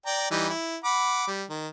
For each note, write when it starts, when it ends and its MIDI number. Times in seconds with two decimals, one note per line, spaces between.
0.06 0.27 74
0.06 0.27 79
0.06 0.27 82
0.31 0.49 52
0.31 0.49 55
0.31 0.49 63
0.50 0.76 64
0.84 1.28 78
0.84 1.28 83
0.84 1.28 86
1.28 1.44 55
1.50 1.68 51